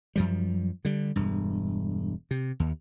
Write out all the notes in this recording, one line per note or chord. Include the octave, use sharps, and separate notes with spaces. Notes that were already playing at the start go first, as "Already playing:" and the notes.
F#2 F3 G3
D3 G3
E1 G2
C3
D#2